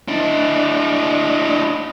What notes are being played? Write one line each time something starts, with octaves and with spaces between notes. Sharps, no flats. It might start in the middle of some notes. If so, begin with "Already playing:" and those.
D4 E4